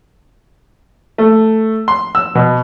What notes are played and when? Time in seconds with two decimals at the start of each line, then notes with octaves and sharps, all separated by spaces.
1.18 A3
1.88 C6
2.15 E6
2.35 B2